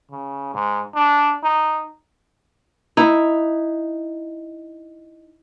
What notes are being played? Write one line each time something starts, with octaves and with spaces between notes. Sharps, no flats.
C#3
G#2
D4
D#4
D#4 E4